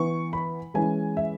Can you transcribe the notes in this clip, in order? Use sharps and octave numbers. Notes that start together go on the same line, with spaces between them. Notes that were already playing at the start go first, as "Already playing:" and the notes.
Already playing: E3 B3 C#6
B5
E3 G#3 C#4 G#5
E5